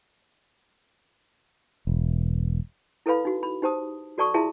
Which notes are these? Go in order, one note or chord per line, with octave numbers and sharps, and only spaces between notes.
E1
E4 A4 B4 F5 B5
D#4 F#4
B5
D#4 G4 C5 A5 D#6
F#4 A4 D5 A5 C#6 D#6
E4 F4 G#4 E5 A5 C6